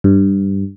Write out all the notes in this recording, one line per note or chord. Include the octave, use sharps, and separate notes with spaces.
G2